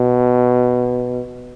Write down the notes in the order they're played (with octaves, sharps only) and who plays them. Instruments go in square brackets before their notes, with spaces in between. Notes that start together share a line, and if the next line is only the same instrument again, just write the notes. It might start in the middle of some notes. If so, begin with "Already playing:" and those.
Already playing: [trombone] B2